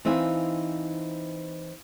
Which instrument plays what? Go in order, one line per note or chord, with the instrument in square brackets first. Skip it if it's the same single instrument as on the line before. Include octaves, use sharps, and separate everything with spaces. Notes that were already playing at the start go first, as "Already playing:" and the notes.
[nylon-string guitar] E3 C4 D#4 E5 F5 G#5